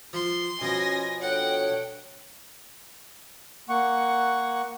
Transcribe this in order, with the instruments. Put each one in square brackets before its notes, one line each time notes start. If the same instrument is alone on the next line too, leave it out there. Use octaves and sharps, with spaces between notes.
[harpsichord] F3 [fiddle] C6
[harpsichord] B2 F3 [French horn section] C#4 [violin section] G#5 A#6
[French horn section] D4 A4 C#5 [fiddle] F#5 [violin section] G5
[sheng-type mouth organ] A#3 F#5 C#6